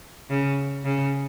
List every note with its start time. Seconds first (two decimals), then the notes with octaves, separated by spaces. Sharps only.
0.30 C#3
0.85 C#3